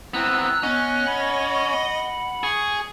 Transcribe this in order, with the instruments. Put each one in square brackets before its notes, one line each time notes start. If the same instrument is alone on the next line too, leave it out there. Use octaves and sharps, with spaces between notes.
[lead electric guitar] B3 C4 [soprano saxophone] E4 [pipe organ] A#5 E6 F#6
[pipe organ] B3 F#6 [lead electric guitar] C#4 [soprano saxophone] D#5
[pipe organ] F#5 B5
[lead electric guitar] G#4 [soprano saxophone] C#6